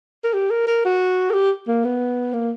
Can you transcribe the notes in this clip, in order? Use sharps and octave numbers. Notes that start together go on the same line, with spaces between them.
A#4
G4
A#4
A#4
F#4
A#4
G4
A#3
B3
A#3